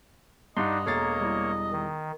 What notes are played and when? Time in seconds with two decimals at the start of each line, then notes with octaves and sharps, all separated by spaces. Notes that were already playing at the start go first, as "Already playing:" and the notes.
0.57 G2 D4 D#4 D#5 F#5 C6
0.86 E1 A#3 A4 C#5 A#5 A6 C7
1.21 G3 E4
1.72 D#3